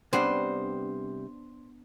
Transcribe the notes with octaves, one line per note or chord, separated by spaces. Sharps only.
C3 G3 B3 D4 B4 C5